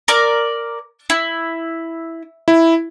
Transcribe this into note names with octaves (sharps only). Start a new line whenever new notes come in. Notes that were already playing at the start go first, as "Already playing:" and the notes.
A#4 D5 D6
E4
E4